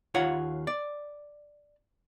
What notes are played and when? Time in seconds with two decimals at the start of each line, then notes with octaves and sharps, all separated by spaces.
0.14 D#2 F4 C#5 F#5
0.67 D5